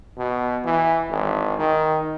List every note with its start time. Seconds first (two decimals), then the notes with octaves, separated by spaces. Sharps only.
0.17 B2
0.65 E3
1.10 G#1
1.59 D#3